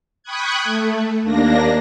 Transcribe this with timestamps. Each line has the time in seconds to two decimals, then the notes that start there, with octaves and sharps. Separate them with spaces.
0.23 G5 B5 C#6 D#6 F#6 G#6
0.64 A3
1.23 D#2 A#3 D4 A#6